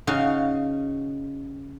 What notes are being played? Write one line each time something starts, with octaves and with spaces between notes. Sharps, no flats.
C#3 C#4 D#4 F#4 F5